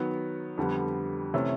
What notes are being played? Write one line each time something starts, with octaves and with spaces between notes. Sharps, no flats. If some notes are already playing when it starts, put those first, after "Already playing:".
Already playing: D#3 F#3 B3
F2 D3 G3 B3
C3 E3 A3 C#4